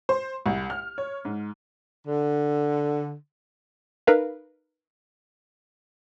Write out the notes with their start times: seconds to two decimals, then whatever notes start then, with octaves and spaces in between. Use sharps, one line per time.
0.09 C5
0.46 C2
0.70 F6
0.98 C#5
1.25 G#2
2.06 D3
4.07 D#4 A#4 B4 F5